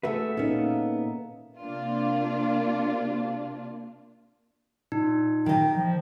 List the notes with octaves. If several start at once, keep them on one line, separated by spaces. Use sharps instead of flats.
A3 F#4 G#4 A4 B4 E5
A#2 A#3 B3 C#4 D#4
C3 A#3 D4 F4
A#2 D#4
D#3 D#5 G5
F3